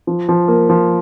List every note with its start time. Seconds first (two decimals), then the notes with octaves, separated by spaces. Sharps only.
0.07 F3
0.29 F3
0.48 A#3
0.69 F3